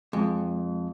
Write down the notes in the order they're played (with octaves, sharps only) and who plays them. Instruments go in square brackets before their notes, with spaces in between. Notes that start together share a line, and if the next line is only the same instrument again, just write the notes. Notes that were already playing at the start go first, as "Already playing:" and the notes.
[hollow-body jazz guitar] F2 [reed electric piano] G#3